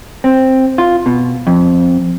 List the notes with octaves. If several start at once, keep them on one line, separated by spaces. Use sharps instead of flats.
C4
F4
B2
F2